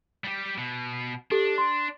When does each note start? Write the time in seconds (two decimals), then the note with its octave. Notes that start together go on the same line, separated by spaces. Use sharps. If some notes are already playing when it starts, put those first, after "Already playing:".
0.24 G3 G4
0.58 B2
1.31 D4 G4 A4
1.58 C6